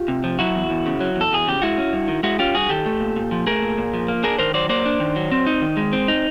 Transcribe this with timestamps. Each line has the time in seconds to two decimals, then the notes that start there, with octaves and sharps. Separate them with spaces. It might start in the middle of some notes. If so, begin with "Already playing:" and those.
Already playing: F4 G4
0.08 C3
0.24 F3
0.39 F#3 E4 F#4
0.55 E2
0.70 E2
0.86 C#3
1.00 F#3
1.16 E2
1.21 A4
1.32 E2 G#4
1.47 C#3 G4
1.62 G#3 E4 F#4
1.78 C#4
1.93 G2
2.08 D#3
2.23 G#3 E4 F#4
2.39 C#4 F4 G4
2.54 G2 F#4 G#4
2.69 D#3 G4 A4
2.86 A3
3.00 A#2
3.16 A#2
3.31 F3
3.47 A3 G#4 A#4
3.62 A#2
3.78 A#2
3.93 F3
4.08 A#3
4.24 D4 G#4 A#4
4.39 D#3 A#4 C5
4.54 F#3 C5 D5
4.69 A#3 C5 D5
4.86 D4
5.00 D#3
5.16 F#3
5.31 C4
5.47 D#4
5.62 D#3
5.77 G#3
5.93 C4
6.08 D#4